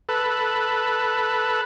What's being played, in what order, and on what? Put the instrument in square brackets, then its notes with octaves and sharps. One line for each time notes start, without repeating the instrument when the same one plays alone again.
[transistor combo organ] A4 B4